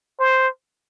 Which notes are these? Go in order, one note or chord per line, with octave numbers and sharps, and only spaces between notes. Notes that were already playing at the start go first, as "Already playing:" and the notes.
C5